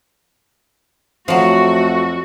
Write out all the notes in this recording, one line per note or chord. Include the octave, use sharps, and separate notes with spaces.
F2 F3 F#3 A3 F#4